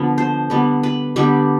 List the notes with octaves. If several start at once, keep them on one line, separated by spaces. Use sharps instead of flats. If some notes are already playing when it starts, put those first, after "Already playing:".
Already playing: D3 F3 B3
C5
D3 G3 B3
B4
D3 G3 B3 G4